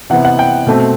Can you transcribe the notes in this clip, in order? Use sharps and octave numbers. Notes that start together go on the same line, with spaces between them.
C3 E3 B3 F#5
F#5
G5
B2 A3 C4